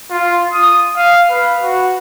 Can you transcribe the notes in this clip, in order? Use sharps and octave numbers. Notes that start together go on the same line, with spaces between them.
F4
D#6
F5
B4
F#4